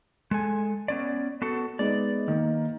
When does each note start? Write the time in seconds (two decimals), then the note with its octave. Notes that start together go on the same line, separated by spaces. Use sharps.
0.31 G#3 A4 G#5
0.88 B3 C#4 D5
1.42 B3 F#4 A4
1.79 G#3 B3 D#4 D5
2.28 D#3 A#3